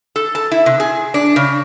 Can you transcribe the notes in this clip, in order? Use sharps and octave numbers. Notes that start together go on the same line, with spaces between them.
A4
A5
E4
C3
G#4
D4
C#3